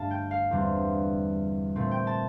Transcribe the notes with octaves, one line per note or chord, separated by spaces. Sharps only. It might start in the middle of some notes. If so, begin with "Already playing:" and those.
Already playing: G2 D3 A3 F5 A5
G5
F5
E2 D3 G3 C4
A#2 A3 C4
G5
A5